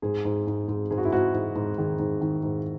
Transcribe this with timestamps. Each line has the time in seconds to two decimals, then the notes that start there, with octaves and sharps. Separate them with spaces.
0.02 G#2 G#4
0.25 G#2
0.47 G#2
0.68 G#2
0.91 G#2 G#4
0.98 F#4
1.05 E4
1.12 G#2 F#4
1.34 G#2
1.55 G#2
1.78 D#3 G#4
1.99 G#2
2.21 D#3
2.43 G#2